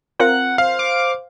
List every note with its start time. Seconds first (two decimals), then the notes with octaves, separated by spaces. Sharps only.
0.20 C4 F4 A#4 F#5
0.58 C5 F5
0.79 D6